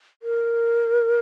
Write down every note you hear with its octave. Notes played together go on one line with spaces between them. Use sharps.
A#4